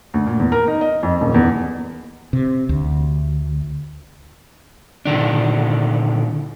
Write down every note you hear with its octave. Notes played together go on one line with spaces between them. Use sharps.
D2
A#2
E2
A#4
D#4
D#5
F2
D#1
E2
C3
D2
A#2 D3 D#3 D4